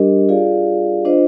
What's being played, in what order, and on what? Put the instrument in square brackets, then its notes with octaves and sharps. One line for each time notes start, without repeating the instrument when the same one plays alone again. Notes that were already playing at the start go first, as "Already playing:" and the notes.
Already playing: [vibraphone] G3 D4 G4 A#4 D#5
F4 G#4 D5 F5
D4 F4 C5 D#5